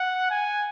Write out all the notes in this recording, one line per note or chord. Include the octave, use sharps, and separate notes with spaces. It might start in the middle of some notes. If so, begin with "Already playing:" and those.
Already playing: F#5
G#5